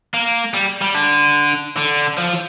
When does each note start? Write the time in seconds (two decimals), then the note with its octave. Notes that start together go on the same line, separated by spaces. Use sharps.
0.14 A#3
0.54 G3
0.82 G3
0.95 D3
1.77 D3
2.18 F3